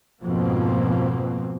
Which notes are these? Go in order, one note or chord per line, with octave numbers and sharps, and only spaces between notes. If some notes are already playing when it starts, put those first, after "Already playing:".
F2 G#2 B2 F3 A#3 C4